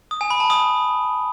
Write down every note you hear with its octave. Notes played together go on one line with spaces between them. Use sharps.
D#6
G#5
B5
A5
D#6